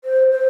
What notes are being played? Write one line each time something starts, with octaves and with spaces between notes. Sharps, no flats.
C5
C5